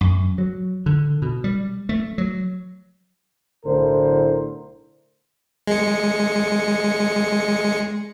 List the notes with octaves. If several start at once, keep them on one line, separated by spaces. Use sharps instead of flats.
F#2
F#3
D3
B2
G3
A3
F#3
B1 A2 D3 E4 A#4 C5
G#3 C#7